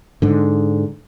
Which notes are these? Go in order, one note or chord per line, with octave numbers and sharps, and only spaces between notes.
G#2 D3